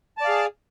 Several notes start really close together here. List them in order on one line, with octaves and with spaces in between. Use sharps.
A5 D5 F5 G#4